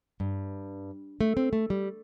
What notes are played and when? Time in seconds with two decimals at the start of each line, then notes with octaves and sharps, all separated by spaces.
0.20 G2
1.21 A3
1.37 C4
1.53 A3
1.70 G3